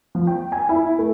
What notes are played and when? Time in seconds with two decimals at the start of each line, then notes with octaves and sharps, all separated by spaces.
0.15 F3
0.27 G5
0.52 G#5
0.69 E4
0.99 A3